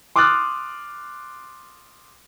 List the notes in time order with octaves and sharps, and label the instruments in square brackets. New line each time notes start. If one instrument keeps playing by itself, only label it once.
[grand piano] C6 D6 D#6 F6 F#6 A6